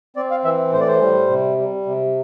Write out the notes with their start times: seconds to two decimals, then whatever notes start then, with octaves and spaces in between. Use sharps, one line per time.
0.16 C4 D5
0.31 F5
0.45 E3 E5
0.73 A2 C5
0.80 D5
0.88 C5
1.02 G3
1.30 C3
1.58 G3
1.86 C3